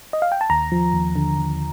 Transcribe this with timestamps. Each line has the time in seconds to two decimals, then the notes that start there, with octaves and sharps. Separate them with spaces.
0.13 D#5
0.22 F5
0.32 G5
0.41 A5
0.50 D#2 A#5
0.72 F3
0.94 D#2
1.16 D3
1.37 D#2